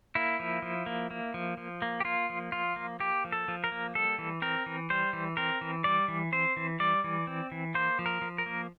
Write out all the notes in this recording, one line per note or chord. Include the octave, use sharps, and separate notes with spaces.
A#3 E4
F3
F3
A#3
A#3
F3
F3
A#3
G4
A#3 F4
F3
F3 F4
A#3
A#3 G4
F3
A4
F3
A#4
A#3
G3 A4
E3
C4 A#4
E3
G3 C5
E3
C4 A#4
E3
G3 D5
E3
C4 C5
E3
G3 D5
E3
C4
E3
A#3 C5
F3
A#4
F3
A#4
A#3